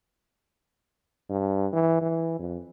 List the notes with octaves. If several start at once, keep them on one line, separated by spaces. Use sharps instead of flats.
G2
E3
E3
F2